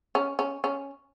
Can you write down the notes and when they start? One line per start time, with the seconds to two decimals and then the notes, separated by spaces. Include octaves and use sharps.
0.15 C#4
0.39 C#4
0.64 C#4